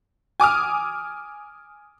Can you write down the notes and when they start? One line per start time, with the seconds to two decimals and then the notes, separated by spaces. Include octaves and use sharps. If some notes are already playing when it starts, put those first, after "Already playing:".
0.40 G#5 D6 D#6 F6